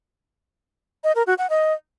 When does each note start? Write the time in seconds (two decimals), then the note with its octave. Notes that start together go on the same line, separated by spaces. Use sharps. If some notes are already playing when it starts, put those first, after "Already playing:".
1.04 D#5
1.15 A#4
1.27 F#4
1.38 F#5
1.50 D#5